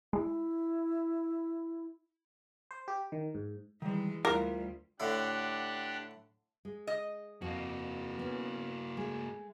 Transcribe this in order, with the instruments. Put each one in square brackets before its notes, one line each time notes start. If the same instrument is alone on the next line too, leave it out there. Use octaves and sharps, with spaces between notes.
[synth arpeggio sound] G#3 [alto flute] E4
[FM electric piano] C5
G4
D#3
G#2
[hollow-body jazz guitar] D#3 G3 [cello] E3 G#3
[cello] D2 G3 [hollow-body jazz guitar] E4 F4 F#5 [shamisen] A#4
[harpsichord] A2 D3 E4 [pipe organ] D4 G4 F#5
[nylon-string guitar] G#3
[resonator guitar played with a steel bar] D#5
[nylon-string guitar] F2 [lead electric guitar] A#3 F#4
[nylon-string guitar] B3 C#4
G#3 A3